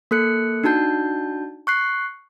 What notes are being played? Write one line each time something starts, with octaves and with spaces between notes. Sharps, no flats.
A#3 A4 F#6 C#7
D4 D#4 F#4 A5 G6
C#6 F#6 C7